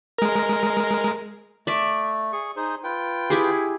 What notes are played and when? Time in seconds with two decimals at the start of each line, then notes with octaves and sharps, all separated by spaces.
0.18 G#3 A#4
1.67 A3 D5 E5
2.32 G#4 C#6
2.56 D#4 G#4 C5
2.84 F4 B4 G5
3.30 E4 G4 G#4